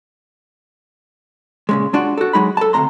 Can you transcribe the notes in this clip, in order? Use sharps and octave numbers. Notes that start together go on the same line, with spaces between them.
A#2 C#3 G#3
G#3 D4 F4 F#4
F#4 A4
F#3 G#3 D#4 B5
A4 A5
D2 C3 F#3 D4 A#5 C6